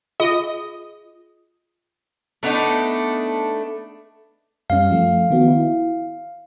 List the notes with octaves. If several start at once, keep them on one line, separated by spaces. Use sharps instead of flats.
F4 G#4 D#5
A3 B3 D4 D#4
F#2 G3 C#4 F5
F3 A3
D#3 B3 F#4
E4